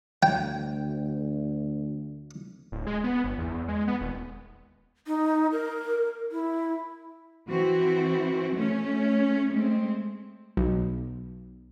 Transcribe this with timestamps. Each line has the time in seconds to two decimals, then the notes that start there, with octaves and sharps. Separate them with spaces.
0.23 D2 G5
2.72 D1
2.87 G#3
3.04 B3
3.24 G1
3.38 E2
3.54 E2
3.68 G#3
3.88 B3
4.01 D#1
5.07 D#4
5.52 A#4
6.32 E4
7.49 E3 C4 F#4
8.55 A3 C#4
9.52 G#3 A3 C4
10.57 B1